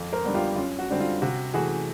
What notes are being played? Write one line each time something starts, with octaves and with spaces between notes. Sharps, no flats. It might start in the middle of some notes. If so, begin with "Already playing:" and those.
Already playing: F2
A#4 C5
D3 G3 B3
F4 G4
F#2 F4
F#4
D3 G3 C4
F4
C3 F#4
E3 A3 F#4 G#4